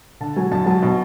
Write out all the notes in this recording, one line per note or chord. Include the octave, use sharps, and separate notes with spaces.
D3 A5
F#3 G#5
F#2 A5
F#3 A5
B2